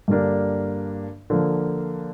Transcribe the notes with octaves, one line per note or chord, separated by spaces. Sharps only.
G2 D3 G3 A#3 D4
D3 F3 A#3